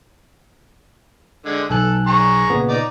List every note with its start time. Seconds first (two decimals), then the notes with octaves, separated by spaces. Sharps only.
1.46 D3 G#3
1.70 B1 A4 G#5 F#6
2.07 G#4 A#5 C#6
2.50 A#2 C#3 B3
2.69 D#4 D5